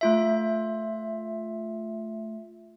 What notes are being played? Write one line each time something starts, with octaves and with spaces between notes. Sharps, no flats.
A3 F4 E5